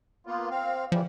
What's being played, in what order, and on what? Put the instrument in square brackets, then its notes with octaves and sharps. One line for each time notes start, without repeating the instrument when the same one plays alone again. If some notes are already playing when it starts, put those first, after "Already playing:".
[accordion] A#3 B3 F4
C4 F5
[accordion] C#3 E3 G3 [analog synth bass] F3